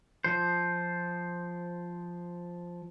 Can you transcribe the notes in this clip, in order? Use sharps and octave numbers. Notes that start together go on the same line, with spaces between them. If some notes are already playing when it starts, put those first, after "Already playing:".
F3 C5